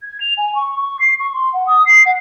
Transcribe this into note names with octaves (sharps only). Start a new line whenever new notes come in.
G#6
F7
G#5
C#6
C#6
C7
C#6
C6
F#5
D#6
C7
F#5